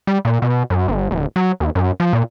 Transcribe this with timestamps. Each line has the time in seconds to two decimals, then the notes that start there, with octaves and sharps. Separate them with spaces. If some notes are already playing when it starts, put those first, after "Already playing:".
0.07 G3
0.25 A#2
0.42 B2
0.70 F#2
0.88 G1
1.11 D1
1.36 F#3
1.60 D#2
1.75 F#2
2.00 F3
2.13 A#2